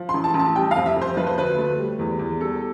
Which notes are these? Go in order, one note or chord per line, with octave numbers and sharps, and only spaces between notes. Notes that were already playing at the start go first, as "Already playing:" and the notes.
Already playing: F3
C6
A1
A5
A1
A5
G3 G5
F5
F2
E5
F2
C5
F3 B4
C5
D2 B4
A3
G3
E2
E2
G3 A4